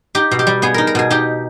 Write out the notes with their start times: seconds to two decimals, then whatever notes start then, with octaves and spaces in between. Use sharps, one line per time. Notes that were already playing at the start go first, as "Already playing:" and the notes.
0.15 D#4 G4
0.31 B2
0.39 G4
0.47 G3
0.62 B3 G#4
0.74 D#4 A#4
0.87 A#4
0.95 B2 G#4
1.10 D#4 G4